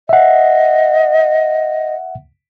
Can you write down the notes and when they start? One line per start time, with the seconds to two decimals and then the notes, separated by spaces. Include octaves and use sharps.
0.09 D#5 E5 F#5